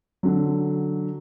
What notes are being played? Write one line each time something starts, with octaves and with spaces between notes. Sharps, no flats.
D3 F#3